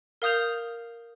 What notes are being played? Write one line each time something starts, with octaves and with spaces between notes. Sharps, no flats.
A#4 F5 D#6 G6 F7